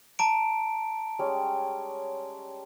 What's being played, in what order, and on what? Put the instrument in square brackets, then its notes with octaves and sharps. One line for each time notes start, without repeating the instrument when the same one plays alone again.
[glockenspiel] A5 A#5 D7
[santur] G3 G#3 C#4